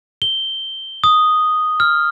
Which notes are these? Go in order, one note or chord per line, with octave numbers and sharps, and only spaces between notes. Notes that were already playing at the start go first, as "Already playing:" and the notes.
G7
D#6
F6